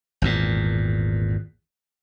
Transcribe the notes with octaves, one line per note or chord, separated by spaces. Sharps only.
G#1 E2 A#2